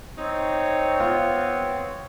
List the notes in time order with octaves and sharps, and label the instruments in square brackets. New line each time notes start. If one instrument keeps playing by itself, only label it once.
[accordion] C4 [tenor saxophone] D#4 [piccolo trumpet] C#5
[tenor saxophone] B3 [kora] F4